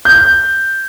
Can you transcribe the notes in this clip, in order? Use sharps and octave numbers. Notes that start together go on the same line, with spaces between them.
G6